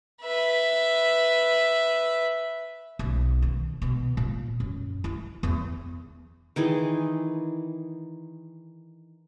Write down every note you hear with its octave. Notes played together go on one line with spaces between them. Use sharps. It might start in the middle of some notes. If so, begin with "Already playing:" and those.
B4 E5
B1
D#3
B2
A#2
F#2
E4
E2
D#3 E3 G#4